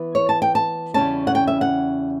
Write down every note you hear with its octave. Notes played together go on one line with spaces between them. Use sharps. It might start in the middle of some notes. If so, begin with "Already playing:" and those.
Already playing: E3 B3 E4
C#5
A5
G5
A5
E2 C#3 G3 C#4 A5
F#5
G5
E5
F#5